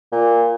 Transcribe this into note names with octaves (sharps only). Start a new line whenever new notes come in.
A#2